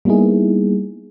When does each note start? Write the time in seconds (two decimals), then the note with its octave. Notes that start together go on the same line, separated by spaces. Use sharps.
0.05 G3 A#3 B3 D#4 E4 G#4